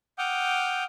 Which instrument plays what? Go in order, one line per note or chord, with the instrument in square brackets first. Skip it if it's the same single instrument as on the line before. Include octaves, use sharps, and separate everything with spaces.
[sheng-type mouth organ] F#5 G5 D6 D#6 F6 G6